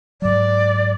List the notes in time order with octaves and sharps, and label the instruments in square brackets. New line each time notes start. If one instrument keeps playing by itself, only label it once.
[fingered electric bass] G#2 F#3 [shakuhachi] D5